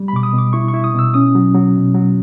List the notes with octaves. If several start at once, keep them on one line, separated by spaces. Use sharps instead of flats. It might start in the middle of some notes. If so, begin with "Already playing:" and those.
Already playing: G3
B5
B2 D6
D#6
B2 D6
E4 C#6
C#6
E4
D#6
B2
E6
C#4 D#6
F#3
F#3
B2
F#3